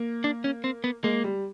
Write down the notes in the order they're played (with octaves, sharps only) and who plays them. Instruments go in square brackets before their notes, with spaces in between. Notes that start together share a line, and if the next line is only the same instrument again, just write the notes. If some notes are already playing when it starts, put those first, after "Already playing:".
Already playing: [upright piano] A#3
[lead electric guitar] D4
C#4
C4
B3
[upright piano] G#3 [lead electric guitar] A#3
[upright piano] G3